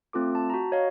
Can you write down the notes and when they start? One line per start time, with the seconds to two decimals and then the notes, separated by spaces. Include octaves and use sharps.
0.13 A3 C4 F4 A4 D6
0.35 A5
0.50 F#4 A#5
0.72 C#5 D#5 F5